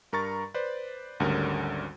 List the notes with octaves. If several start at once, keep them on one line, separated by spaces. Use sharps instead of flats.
G2 A#4 A#5 C#6 A6
B4 C5 D5
G#1 D2 D3 G3 C#4 A#4